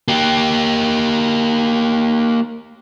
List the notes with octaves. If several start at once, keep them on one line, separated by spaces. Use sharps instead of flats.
A#3 G4